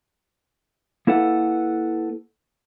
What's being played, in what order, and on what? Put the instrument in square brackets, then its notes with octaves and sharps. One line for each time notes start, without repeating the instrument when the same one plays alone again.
[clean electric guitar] A#3 E4 A4 B4 F#5